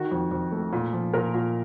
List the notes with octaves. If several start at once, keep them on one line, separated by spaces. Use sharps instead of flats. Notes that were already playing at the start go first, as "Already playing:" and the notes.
Already playing: D#3 F#4
F2
F2
A3
A#2
F3
A#2 A#4
A#2